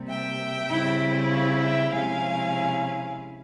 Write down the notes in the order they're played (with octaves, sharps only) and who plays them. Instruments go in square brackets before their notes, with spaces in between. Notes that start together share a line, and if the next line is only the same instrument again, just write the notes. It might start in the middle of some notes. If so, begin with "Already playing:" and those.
Already playing: [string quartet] C3 G3 A#3
E5 G5
C#3 G3 C4 E4
C#5 F5
E5 G5
C3 F3 G#3 C#4 E4 F5 G#5